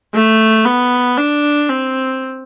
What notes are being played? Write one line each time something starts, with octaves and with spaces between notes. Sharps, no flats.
A3
B3
D4
C4